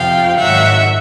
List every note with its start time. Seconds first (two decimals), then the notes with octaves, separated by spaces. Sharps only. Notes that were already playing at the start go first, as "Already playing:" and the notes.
Already playing: F2 C3 F3 F5 G5
0.37 G#2 D#3 F#3 E5 F#5